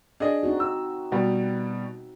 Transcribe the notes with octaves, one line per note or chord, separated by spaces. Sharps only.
D4 G#4 D#5
C4 D#4 F#4
E6
B2 G3 B3